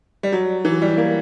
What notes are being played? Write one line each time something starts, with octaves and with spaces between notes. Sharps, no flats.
G3
F#3
E3
F#3
G3
A#3